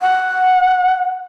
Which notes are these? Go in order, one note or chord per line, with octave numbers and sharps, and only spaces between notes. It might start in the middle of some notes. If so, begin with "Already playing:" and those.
F#5